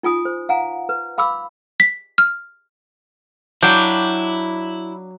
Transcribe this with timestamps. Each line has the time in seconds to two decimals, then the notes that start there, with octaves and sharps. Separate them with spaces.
0.03 D#4 F4 G#5 D#6
0.25 C5
0.49 F5 F#5 G#5 A#5
0.89 B4
1.18 F5 B5 D6 E6
1.80 B6
2.18 F6
3.63 F#3 D4 E4 F5 G5 D6 G6